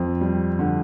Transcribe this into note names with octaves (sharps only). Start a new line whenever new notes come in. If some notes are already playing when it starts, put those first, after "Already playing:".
Already playing: F2 C4
G3
D3